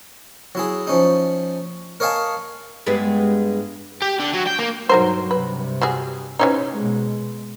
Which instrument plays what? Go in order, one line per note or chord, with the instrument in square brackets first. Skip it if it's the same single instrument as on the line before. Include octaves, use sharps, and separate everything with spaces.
[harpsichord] F#3 E4 G#4
F3 C#4 D#4
A#4 C#5 D#5 F5 G#5 A5
[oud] G2 G#3 B3
[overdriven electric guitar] G4
D3
F#3
G5
A#3
[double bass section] G2 B2 F#3 [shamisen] D#4 A#4 C5
[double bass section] G2 C3 [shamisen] B4
[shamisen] G3 F#4 G#4
[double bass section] C3 [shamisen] E3 C#4 D#4
[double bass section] B2 G#3